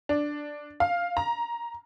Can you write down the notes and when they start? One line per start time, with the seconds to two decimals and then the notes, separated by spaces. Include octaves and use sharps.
0.09 D4
0.80 F5
1.17 A#5